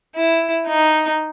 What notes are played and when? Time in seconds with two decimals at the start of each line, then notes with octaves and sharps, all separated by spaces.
0.15 E4
0.67 D#4